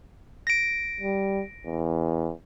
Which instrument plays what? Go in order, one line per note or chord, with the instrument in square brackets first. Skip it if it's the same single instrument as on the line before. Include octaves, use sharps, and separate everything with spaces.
[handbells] A#6 D7
[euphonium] G3
E2